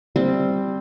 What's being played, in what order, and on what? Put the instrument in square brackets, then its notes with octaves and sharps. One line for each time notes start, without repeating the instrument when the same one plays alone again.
[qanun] G3 C4